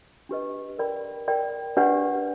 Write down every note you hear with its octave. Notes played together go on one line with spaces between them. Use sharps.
D4 G4 B4 D#5
A#4 D5 G5 B5
A#4 D5 G5 B5
D4 G4 B4 D5 F#5